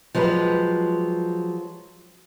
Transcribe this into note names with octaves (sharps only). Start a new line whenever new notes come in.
F3 F#3 G#3 G4 B4